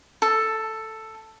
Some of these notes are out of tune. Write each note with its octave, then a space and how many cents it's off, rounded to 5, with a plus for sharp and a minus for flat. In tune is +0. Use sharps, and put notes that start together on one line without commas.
A4 +5